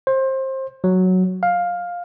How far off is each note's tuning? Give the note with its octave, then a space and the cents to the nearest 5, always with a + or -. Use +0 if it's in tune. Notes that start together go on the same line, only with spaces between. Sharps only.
C5 +25
F#3 +0
F5 +10